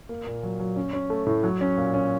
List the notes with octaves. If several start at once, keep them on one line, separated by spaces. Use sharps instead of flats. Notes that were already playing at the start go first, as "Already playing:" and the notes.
A#3
A#2
F#3
F#3
C#4
C#4
A3
A2
F#3
C#4
A#2
C#4